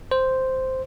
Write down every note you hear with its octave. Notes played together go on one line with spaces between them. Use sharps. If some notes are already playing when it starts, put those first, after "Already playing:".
C5